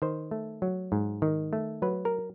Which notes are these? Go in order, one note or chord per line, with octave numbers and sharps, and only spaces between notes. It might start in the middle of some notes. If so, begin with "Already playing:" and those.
D#3 C5
A3
F#3
G#2
D#3
A3
F#3 B4
A#4